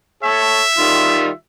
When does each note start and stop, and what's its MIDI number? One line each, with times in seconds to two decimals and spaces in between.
0.23 0.61 69
0.23 0.61 73
0.23 1.36 76
0.78 1.29 51
0.78 1.29 55
0.78 1.29 65